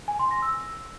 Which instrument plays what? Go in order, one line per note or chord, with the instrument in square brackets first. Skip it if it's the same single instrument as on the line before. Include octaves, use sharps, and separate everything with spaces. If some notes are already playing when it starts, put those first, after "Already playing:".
[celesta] G#5
C6
A#6
E6